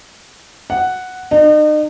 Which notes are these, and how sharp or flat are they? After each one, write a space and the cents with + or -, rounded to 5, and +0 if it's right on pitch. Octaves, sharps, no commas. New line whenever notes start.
F#5 +0
D#4 -40